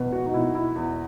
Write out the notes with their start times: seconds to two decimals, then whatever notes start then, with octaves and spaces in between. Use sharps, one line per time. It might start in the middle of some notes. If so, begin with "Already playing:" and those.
Already playing: E2 B2 B4
0.13 F#4
0.26 D#4
0.34 B2 E4
0.55 E4
0.76 E2